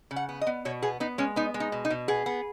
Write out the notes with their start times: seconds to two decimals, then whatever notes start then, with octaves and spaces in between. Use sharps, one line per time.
0.11 C#3
0.16 F#5
0.29 B3
0.41 D#5
0.47 B3
0.65 B2 C#5
0.82 B3 G#4
1.00 B3 D#4
1.18 G#3 C#4
1.36 B3 D#4
1.54 G#3
1.60 D#4
1.72 B2
1.85 D#4
1.90 B2
2.08 B3 G#4
2.26 B3